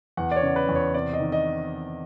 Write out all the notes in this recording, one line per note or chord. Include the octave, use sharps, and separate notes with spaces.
E2 F#5
D5
C#5
C#3
B4
E2
C#5
C3 D5
D#5
D#3
D#5